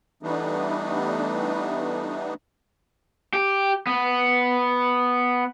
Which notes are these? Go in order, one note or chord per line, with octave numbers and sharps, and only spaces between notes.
E3 G3 A3 B3 D4 D#4
G4
B3